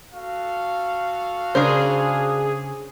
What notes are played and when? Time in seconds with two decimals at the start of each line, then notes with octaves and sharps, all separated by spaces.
0.13 F#4 A4 F5
1.55 C#3 D4 G#4 A#4 C5